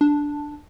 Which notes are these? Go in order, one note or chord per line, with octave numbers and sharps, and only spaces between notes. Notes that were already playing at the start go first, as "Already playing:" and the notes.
D4